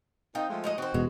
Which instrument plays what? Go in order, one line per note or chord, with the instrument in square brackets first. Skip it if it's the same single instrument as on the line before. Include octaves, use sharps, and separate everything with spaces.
[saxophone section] C4 D#4 [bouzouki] F4 G5
[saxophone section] F3 G#3 A3
[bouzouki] D#4 F#4 D#5
[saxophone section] D#3 F#4 [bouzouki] C4 C5
[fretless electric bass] E1 B2 [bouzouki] G#3